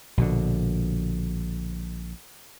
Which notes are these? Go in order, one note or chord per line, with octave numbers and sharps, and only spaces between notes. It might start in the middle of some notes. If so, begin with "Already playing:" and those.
A#1 B2 D3